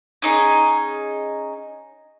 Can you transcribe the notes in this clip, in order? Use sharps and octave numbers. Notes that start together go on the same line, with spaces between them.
C#4 D#4 G#4